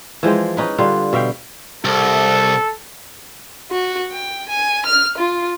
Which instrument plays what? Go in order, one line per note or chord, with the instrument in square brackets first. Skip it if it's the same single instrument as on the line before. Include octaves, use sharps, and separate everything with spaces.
[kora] E3 F3 G#3 G5
C#4 D#4 B4
D3 G3 F4 F5
B2 E5 F5 G5
[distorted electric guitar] C2 [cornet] A4
[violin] F#4
G5
G#5
F6
F4